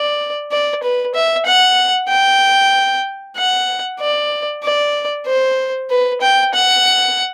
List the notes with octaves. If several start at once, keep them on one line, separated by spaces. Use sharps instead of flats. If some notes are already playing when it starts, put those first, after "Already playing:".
Already playing: D5
D5
B4
E5
F#5
G5
F#5
D5
D5
C5
B4
G5
F#5